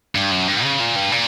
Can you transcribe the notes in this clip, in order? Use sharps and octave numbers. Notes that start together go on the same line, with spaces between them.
G2
F#2
G2
C#3
A#2
G2
A#2